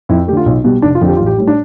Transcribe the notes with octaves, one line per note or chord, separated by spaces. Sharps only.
F2 E4
A3 G4
D3 F4
B1
B2 G3
F1 D4
F4
F2 D3 F3
G4
A1 F4
G4
A2 G3
D4